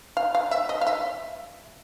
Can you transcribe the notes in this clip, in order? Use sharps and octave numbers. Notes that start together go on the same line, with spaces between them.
F5
F5
E5
D#5
F5
E5